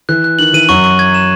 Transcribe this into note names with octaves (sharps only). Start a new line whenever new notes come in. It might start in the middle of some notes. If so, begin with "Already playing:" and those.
E3 F#6
F#6
D#3 F#7
E3 D#7
F#2 F#3 C#6
C#6
G#6
E7